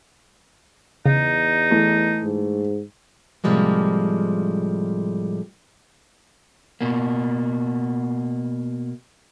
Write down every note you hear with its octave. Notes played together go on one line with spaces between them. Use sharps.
E2 C#3 D#4
E3 A3
G#2
A2 C3 F3 G3 G#3 A#3
B2 A#3